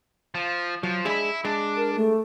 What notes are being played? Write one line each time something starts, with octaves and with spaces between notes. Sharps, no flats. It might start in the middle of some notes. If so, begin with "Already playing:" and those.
F3
F3 F#3
G#3 D4 E4 G#4 B5
G#3 D4
A#4
A3